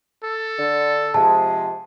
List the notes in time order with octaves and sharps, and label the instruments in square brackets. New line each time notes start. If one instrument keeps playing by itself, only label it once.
[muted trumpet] A4
[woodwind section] D3
[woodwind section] C3 F3 G#3 [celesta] A5